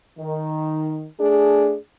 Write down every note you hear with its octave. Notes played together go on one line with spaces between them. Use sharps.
D#3
A3 D4 G#4